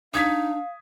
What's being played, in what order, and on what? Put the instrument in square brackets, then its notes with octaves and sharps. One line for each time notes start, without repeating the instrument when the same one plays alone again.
[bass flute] D4 [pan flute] D#4 [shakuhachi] F5 [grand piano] D#6 G#6 B6